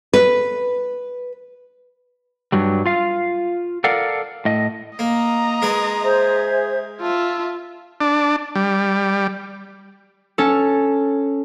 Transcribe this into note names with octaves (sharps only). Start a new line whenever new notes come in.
B4
G2 F#3 G3
F4 F5
A4 A#4 D5 F5 F#5
A2 D#5
A#3 D#5 A#5
G#3 A#4 B4
G#4 C5 E5
F4 E5 A5
D4
G3
C#4 A4